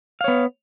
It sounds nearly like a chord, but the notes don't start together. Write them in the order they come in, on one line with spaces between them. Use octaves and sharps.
F5 C#5 B3